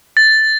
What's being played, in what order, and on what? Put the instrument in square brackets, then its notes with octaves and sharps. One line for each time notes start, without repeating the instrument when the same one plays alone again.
[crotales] A6